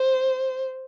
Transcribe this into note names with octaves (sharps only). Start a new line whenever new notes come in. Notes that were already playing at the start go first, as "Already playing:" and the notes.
Already playing: C5